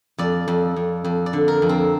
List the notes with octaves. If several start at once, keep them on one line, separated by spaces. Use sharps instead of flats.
F2 D5
F2
F2
F2
D5
D3
A#4
F2
C4